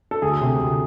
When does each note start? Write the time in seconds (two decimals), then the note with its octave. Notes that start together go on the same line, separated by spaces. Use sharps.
0.11 A4
0.22 D2 G#4
0.41 C3
0.60 D2